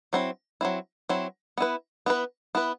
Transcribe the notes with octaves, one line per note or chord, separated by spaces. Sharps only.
F#3 C4 E4
F#3 C4 E4
F#3 C4 E4
B3 E4 B4
B3 E4 B4
B3 E4 B4